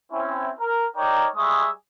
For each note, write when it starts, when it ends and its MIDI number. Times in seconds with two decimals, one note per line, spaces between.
0.13 0.51 60
0.13 0.51 61
0.13 0.51 64
0.60 0.87 70
0.97 1.27 63
0.97 1.27 70
0.97 1.27 73
0.97 1.27 74
0.97 1.27 79
0.97 1.27 82
1.37 1.69 55
1.37 1.69 56
1.37 1.69 68
1.37 1.69 76
1.37 1.69 85
1.37 1.69 87